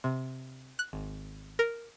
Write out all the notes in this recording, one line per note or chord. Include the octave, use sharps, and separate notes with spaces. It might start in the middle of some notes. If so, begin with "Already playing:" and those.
C3
F#6
G#1
A#4